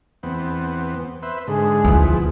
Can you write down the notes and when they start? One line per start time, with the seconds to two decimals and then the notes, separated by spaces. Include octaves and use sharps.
0.23 E2 B3 C4
1.23 B4 C5 E5
1.47 G#2 D3 G#4
1.84 D2 D#3 F3 B3 E4